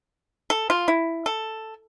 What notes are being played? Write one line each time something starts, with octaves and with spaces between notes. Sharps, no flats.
A4
F4
E4
A4